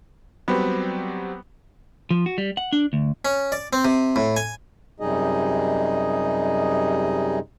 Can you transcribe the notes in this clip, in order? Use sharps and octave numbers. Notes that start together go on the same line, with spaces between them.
F#3 G3 B3 C4
F3
F#4
G3
F#5
D4
D2
C#4
D5
C4
C3
A2
G#5
F#2 C3 G3 D#4 G#4 D#5